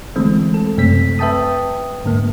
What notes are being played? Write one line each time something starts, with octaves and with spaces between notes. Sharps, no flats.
D3 E3 G#3 A3 C4
A4
F#2 C3 A3 C4 B6
B4 E5 G5 A5 D#6
G#2 D3 A#3